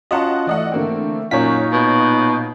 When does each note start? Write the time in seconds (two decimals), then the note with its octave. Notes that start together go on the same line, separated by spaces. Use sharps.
0.11 C#4 F4 F#4 D#5 F#5 A5
0.47 E3 A3 D5 D#5 F#5
0.72 D3 A3 A#3 C4
1.31 F#2 A#2 D#4 F4 C#5 B6
1.72 B2